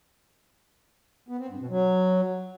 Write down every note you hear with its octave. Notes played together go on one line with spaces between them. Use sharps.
B3
C4
G2
B2
F#3